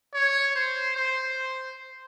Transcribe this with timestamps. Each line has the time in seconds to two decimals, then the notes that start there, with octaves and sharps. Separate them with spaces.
0.14 C#5
0.56 C5
0.97 C5